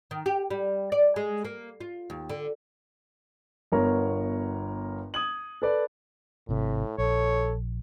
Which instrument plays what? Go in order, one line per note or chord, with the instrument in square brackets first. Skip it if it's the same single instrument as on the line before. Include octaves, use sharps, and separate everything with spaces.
[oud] D#3
G4
G3
D5
G#3
A#3
F4
D#2
D3
[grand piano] G1 B3 A#4 C#5 A#5
D#6 G#6 F#7
A4 B4 D5
[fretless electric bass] G#1 C3 [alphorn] A2
[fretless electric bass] A#1 [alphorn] A4 [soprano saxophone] C#5